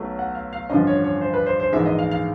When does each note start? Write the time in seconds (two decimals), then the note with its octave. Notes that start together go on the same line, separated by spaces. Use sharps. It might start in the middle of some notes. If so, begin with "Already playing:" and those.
Already playing: B1 B2 F#3 A3
0.19 F#5
0.35 F5
0.53 F5
0.70 A1 G2 D3 F3 D#5
0.87 C#5
1.04 C#5
1.21 C5
1.34 B4
1.46 C5
1.60 C5
1.73 A#1 G#2 E3 G#3 E5
1.86 D#5
1.99 F5
2.11 F5